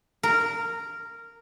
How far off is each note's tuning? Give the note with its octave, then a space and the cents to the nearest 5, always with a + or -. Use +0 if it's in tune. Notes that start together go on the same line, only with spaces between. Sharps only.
A#4 -10